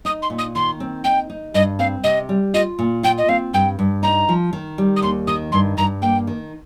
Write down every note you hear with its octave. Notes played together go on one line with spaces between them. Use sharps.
D#4 D#6
C6
A#2
D#6
D#3 C6
C4
D#4 G5
D#4
G2 D#5
C4 F5
C3 D#5
G3
F4 D#5
A#2
F4 G5
D#5
C4 F5
G2 G5
G2
D#4 A#5
F3
D#3
G3
D#6
D#2 C6
D#3 D#6
G2 C6
G2 A#5
A#3 G5
D#3